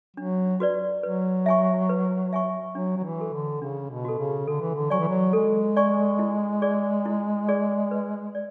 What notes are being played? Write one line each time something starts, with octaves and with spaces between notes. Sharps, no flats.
F#3 D4
F#4 B4 D5
F#3 B4
E5 G#5 C#6
B4
E5 G#5 C#6
F#3 D4
F#3
E3
F#4 A4
D3
C#3 D4
B2
F#4 A4
C#3
D3 A4
E3
D3
F#3 D5 G#5 C#6
E3
F#3
G#3 A4
D5 G#5 C#6
E4
G#4 D5
E4
G#4 D5
B4
D5